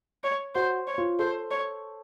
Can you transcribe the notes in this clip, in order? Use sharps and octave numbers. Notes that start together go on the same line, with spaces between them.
C#5
F#4 C5
C#5
F4
A4 C5
C#5